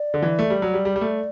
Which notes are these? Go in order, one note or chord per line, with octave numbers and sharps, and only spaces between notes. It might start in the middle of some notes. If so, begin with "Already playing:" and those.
Already playing: D5
D3
E3
A3
G3
F#3
G3
G3
G3
A3